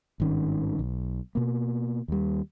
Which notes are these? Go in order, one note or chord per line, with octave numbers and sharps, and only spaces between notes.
G#1 G2 D#3 C#4
B1
B2 A#3
D#2 G3